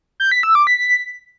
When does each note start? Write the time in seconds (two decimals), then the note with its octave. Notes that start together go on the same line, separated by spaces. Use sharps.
0.20 G6
0.32 B6
0.43 E6
0.55 D6
0.67 B6